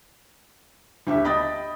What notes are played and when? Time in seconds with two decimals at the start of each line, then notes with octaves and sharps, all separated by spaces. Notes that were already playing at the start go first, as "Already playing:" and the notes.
1.07 D2 G4 E5
1.24 D#5 G5 B5 D#6 A6 A#6